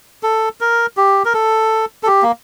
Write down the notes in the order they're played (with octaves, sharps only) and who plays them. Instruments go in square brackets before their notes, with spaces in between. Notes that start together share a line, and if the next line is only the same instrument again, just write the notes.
[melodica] A4
A#4
G4
A#4
A4
A4
G4
A#3